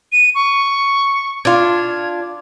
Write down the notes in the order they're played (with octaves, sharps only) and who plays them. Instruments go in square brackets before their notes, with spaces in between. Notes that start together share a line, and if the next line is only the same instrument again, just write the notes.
[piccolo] D#7
C#6
[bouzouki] D4 F4 [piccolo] G#6